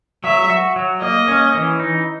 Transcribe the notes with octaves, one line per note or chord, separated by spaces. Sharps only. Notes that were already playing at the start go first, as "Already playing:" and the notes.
F#3 E5
F#4
F#3
A#3 D#5
C#4
E3
D#4